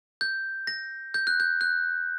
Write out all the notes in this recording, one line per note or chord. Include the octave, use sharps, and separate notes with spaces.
G6
A#6
G6
F#6
G6
F#6